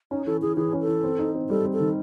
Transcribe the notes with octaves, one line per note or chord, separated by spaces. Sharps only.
C#4 D#4
E3 A4
E3 G#4
E3 G#4
C#4
A4
E3
C4
D#4
C4
G3 A4
C4
A4
D#3